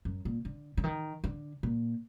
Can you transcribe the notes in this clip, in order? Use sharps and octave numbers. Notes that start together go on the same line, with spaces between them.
F#2
A#2
D3
D3
D#3
D3
A#2